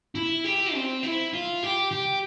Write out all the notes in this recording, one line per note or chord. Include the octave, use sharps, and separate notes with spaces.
E4
G4
C4
E4
F4
G4
G4